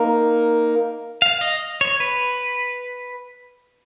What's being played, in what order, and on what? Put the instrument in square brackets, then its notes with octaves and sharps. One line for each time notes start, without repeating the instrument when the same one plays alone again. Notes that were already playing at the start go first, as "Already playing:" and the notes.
Already playing: [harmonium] A#3 D#4 A#4
[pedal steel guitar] F5
D#5
C#5
B4